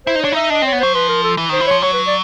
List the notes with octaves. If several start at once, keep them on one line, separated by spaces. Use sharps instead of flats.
E4 C5
D#4
D4 C#5
D#4 E5
D4 D#5
C4 C#5
B3
F#3 C5
F3 B4
A#4
A4
E3
D#3 C5
E3
F3 C#5
F#3 C#5
B4
D5